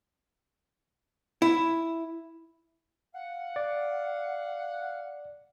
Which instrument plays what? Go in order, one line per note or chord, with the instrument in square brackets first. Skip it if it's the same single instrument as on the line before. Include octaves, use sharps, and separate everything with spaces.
[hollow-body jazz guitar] E4
[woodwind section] F5 F#5
[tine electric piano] D5